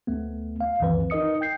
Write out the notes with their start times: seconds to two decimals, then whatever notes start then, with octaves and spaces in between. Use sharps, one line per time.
0.07 D2 A3 B3
0.61 F5
0.80 C#2 F#2 D#3 E3 C4 B4
1.10 D#4 A#4 D#5 D#6 C#7
1.41 G5 G6 C7